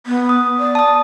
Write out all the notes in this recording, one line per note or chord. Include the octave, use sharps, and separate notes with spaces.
B3
D#6
D5
A5 D#6